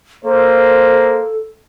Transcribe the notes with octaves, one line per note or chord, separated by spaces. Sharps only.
A#3 A4 C5